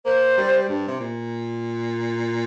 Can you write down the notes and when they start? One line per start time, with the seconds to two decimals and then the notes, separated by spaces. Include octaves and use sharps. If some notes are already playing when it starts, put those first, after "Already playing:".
0.05 A#3 C5
0.38 G3
0.69 G2
0.88 C3
1.00 A#2